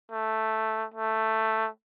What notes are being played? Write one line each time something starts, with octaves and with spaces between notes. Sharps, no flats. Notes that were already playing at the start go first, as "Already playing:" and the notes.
A3
A3